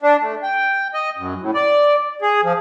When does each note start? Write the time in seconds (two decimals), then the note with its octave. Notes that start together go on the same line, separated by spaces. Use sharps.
0.02 D4
0.21 A3
0.43 G5
0.94 D#5
1.17 F#2
1.41 A2
1.54 D5
2.22 G#4
2.43 F3